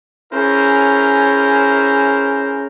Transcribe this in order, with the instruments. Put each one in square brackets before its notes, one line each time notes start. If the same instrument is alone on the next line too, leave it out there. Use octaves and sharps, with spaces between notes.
[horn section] C#4 E4 G#4 A#4 C5